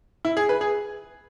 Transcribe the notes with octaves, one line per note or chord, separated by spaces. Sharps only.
E4
G#4
B4
G#4